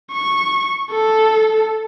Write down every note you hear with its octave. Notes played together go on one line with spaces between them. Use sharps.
C#6
A4